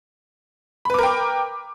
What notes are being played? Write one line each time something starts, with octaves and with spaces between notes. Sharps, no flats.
A#4 B4 G5 B5 D6